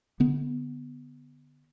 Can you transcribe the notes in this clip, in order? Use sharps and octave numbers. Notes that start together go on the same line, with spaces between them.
D3 B3